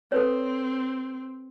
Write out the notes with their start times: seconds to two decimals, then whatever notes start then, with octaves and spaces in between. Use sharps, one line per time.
0.12 C4 A4 B4 C#5